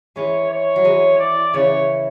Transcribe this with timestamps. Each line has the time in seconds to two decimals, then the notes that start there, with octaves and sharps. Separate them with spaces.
0.16 E3 G#3 C#5
0.51 C#5
0.76 F#3
0.85 E3 G#3
1.19 D5
1.53 C#3 E3 C#5